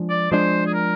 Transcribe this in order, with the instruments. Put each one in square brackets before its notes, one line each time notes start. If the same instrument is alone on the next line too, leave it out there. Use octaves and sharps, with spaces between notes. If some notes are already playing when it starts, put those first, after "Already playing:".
Already playing: [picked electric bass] F3 G#3 D4
[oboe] D5
[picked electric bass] F3 G#3 D4 [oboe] C5
[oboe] G#4
A#4